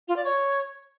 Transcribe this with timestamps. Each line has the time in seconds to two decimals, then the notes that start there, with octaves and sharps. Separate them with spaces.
0.08 F4
0.16 D5
0.25 C#5